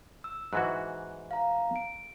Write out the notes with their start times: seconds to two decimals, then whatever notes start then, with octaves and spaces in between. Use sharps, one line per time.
0.24 E6
0.53 G#2 E3 F#4 F#6
1.31 F5 A#5
1.76 D7